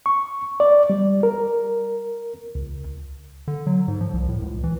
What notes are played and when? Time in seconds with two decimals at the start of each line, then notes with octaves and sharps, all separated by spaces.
0.06 C#6
0.60 D5
0.90 G3
1.23 A#4
2.55 C#2
3.48 D3
3.67 F#3
3.88 G#2
4.01 F3
4.14 C2
4.29 A2
4.42 C#2
4.64 E3